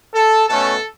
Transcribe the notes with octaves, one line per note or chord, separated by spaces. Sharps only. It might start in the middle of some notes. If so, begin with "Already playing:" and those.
A4
B2 A3 C#4 A4